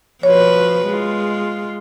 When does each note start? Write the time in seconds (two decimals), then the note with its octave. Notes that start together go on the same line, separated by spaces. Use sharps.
0.23 F3 F#4 B4 C#5
0.87 G#3 F4